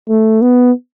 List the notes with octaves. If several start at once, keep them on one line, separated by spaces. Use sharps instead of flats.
A3
B3